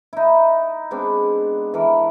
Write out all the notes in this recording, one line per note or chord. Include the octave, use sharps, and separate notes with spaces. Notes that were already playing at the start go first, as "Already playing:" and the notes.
D#4 E4
G#3 B3 C4 D4
E3 A4 A#4